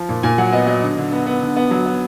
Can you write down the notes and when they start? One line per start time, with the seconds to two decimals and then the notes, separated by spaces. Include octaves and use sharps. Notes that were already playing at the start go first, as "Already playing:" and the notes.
Already playing: F3
0.09 A#2
0.23 A#2 G#5
0.38 F#3 F#5
0.53 B3 D#5
0.67 F#3 D#5
0.83 D3
0.97 D3
1.12 B3
1.26 B3
1.42 D3
1.56 B3
1.71 F#3
1.86 B3